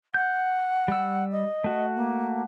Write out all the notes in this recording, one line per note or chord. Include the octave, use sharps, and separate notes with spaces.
F#5 G6
G3 E6
D#5
A3 F#4
A#3